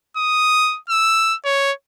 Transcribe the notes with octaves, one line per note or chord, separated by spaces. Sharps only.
D#6
E6
C#5